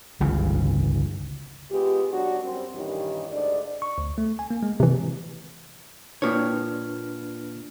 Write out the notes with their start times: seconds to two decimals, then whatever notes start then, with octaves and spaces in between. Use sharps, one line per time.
0.20 G1 C#2 C#3 E3
1.71 G#3 B3 F4 G4
2.11 B2 F#3 D4 F#4
2.42 F#2 G3 C4
2.74 G2 A#2 D#3 E3 C#4 G4
3.31 D2 G#2 D4 D5
3.82 C#6
3.98 D2
4.18 A3
4.39 G#5
4.51 A#3
4.63 G#3
4.80 C3 E3
6.22 A#2 D4 B4 C#5 F6